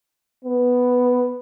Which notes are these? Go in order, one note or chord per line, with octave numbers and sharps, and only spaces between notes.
B3